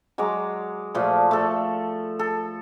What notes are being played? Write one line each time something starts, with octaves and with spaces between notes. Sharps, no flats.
F#3 G#3 A#5 D6
A#2 F3 A3
A3 A4
A4